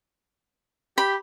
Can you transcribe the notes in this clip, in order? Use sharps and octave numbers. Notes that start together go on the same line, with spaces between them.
G4 B5